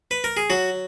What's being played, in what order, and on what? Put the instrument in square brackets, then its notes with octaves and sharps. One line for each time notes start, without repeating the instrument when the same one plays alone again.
[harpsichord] B4
A#4
G#4
F#3 F#4